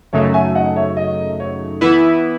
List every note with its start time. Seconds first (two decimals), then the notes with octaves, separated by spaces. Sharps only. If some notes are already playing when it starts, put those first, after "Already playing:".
0.13 F#2 C#3 F#3 A3 D#4 C#5 E5
0.34 E5 G#5
0.55 D#5 F#5
0.76 C#5 E5
0.97 D#5
1.40 C#5
1.81 E3 B3 E4 B4